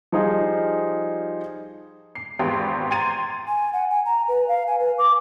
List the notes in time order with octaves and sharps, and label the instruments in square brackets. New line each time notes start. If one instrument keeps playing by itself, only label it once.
[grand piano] F3 G3 D#4 F4 G#4
[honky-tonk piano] C7
G#1 E2 B3 G4 C6
G5 A#5 C6 G#6 A6 D#7
[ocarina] G#5
F#5
G#5
A#5
B4
F5
G#5
B4
D6